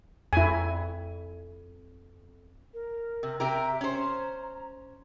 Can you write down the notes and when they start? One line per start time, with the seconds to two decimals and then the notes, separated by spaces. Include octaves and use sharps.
0.33 F2 E4 G#5
2.73 A#4
3.23 C3
3.40 C3 G4 A#4 E5
3.81 C#4 C5 A#5